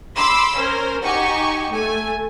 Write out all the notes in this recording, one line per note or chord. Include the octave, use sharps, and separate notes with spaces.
B5 C6 D6 E6
C#4 A#4 C5
D#4 F#4 G4 G#5 C#6
A3 G#5